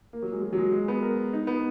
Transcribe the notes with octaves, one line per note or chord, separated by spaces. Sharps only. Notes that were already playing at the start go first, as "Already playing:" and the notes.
A#3
F#3
G#3
F#3
F#3
G#3
G#3
B3
A#4
D#4
B3